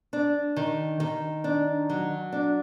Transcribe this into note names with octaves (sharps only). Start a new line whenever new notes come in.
D4
D#3
D#3
D4
F#3
D4